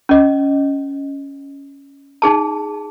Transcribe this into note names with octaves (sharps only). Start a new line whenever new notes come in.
C#4 D#5
D#4 G#4 A5